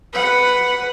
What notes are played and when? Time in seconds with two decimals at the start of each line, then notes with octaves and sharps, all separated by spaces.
0.13 B4 F#5